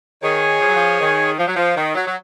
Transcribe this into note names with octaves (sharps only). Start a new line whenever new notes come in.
D#3 G#4 C#5 G#5
F3
F#3
F3
D#3
F3
F#3
F3
D#3
F#3
F#3